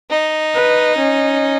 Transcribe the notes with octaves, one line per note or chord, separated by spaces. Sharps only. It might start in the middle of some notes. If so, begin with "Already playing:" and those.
D#4
B4
C#4